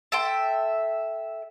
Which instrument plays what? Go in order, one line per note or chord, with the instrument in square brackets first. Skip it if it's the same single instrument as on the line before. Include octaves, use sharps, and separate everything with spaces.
[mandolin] A4 E5 G5 C6